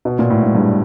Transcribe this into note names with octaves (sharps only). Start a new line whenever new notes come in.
B2
A#2
A2
G#2
G2